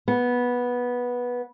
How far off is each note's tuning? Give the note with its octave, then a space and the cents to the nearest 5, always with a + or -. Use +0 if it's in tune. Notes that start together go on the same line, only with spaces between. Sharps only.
B3 -10